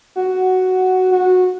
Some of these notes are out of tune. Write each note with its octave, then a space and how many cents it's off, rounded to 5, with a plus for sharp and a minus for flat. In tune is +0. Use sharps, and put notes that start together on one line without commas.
F#4 +5
F#4 -15